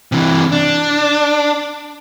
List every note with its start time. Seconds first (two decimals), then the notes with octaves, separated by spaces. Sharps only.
0.12 C3 E3
0.52 D4